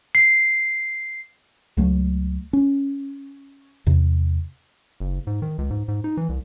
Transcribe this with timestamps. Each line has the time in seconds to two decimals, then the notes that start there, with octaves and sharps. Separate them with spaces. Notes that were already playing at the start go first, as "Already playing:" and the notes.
0.15 C7
1.77 C#2 F#3 A3
2.53 C#4
3.87 E2 C3
5.00 F#1
5.27 G#2
5.42 D#3
5.58 C#2
5.70 G#2
5.88 G#2
6.04 D#4
6.17 E3
6.29 C2